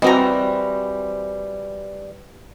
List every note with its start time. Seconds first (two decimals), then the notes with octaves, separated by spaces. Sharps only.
0.02 E3 G3 C4 F#4 D#5 A#5